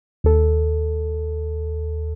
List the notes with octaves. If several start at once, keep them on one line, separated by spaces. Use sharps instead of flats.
D#2 A4